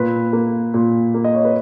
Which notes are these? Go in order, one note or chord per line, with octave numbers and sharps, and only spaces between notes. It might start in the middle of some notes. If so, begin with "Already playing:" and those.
Already playing: A#2 B4
A#3
A#2
A#3
D#5
C#5
B4